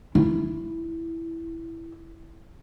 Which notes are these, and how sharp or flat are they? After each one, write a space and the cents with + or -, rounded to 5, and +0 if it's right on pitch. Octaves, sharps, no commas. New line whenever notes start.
E4 +0